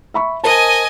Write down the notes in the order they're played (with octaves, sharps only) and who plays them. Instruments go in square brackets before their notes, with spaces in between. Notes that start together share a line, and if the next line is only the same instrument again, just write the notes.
[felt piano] E5 B5 C#6
[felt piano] A#4 C5 A5 [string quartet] D#5 G#5